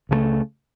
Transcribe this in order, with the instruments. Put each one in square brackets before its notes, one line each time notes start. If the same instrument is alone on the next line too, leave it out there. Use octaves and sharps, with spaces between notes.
[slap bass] C#2 C#3 E3 A3